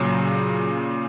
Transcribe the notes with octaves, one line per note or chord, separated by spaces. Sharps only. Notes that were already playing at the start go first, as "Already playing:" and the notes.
Already playing: A#2 C#3 F#3 C#4 F#4